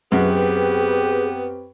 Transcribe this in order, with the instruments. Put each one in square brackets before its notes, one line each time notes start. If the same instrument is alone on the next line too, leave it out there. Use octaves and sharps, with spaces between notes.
[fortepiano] F#2 [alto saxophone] B3 [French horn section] C4 G4 B4 [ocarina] G#4